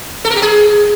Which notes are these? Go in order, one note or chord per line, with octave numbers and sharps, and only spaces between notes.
A4
A#4
G4
G#4